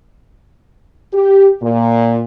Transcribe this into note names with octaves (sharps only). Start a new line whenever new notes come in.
G4
A#2